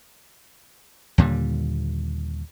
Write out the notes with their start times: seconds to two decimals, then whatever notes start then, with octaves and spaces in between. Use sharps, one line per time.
1.18 D#2 A#2 D3 G3